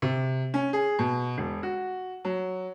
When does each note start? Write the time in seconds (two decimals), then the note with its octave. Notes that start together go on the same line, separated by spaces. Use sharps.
0.02 C3
0.54 C#4
0.73 G#4
0.99 B2
1.38 E1
1.63 F#4
2.25 F#3